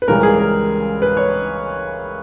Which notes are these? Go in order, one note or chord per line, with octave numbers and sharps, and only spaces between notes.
B4
C#2 C#3 E3 G3 A#4
G#4
A#4
B4
C#5